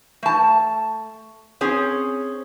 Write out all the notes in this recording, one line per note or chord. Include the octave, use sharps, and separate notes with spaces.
A3 A5
C4 C#4 G#4